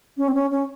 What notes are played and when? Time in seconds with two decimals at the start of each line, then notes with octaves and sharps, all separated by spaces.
0.17 C#4
0.28 C4
0.35 C#4
0.51 C#4